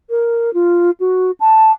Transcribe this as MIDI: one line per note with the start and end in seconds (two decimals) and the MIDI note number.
0.10 0.53 70
0.54 0.91 65
1.00 1.31 66
1.40 1.71 81